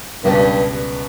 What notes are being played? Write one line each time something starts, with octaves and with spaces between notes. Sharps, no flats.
C#2 G2 B2 G3 B3